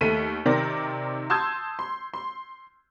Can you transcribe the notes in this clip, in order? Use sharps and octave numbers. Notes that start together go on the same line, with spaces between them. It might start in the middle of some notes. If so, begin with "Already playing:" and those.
D#2 A3 B6 D#7
C3 D#3 C4 A#4 D5 A#6
A5 C6 D#6 E6 G6 G#6
C6
C6